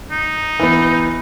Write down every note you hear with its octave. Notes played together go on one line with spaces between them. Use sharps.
D#4
E3 B3